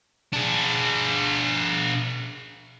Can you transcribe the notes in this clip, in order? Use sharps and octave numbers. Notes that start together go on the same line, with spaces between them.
D4 G#4